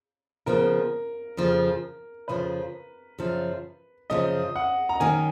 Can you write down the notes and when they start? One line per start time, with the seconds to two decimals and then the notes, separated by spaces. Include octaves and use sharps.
0.46 C#3 F3 B3 A#4
1.37 F2 C#3 F3
2.28 F2 C#3 F3 B4
3.18 F#2 C#3 F3
4.10 F#2 C#3 F3 D#5
4.56 F#5
4.89 A#5
5.00 D#3 F#3 C#4 G#5